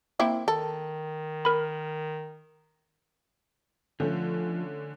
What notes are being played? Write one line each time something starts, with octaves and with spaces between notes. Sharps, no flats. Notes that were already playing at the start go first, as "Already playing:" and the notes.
A#3 C4 E4
D#3 A4
A#4 B5
D3 F3 A3 C#4